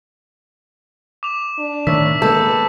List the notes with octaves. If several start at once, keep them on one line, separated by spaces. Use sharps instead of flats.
D6 F7
D4
A2 D#3 E6 B6
G#3 A#3 A4 B4 E6 G6